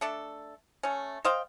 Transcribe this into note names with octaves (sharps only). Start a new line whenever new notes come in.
A3 D4 A4
A3 C#4
C5 D#5 F5 G5